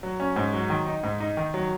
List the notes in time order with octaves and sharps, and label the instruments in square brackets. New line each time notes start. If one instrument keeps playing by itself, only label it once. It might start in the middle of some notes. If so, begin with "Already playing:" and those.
[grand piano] F#3
C#4
G#2
F#3
D#3
D#4
G#2
D#4
D#3
F#3